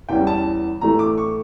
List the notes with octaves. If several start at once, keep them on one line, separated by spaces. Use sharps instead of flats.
E2 E3 G3 C#4 G5
A5
A2 E3 A3 A#5
D6
C#6